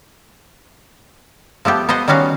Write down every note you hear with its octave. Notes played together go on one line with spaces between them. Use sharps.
F3 A3 B3 G4
B3 B4 C5 D#5 F#5
D#3 G3 C#4 F#4 F5